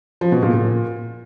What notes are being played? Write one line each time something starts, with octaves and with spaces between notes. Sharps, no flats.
F3
B2
A#2
A#2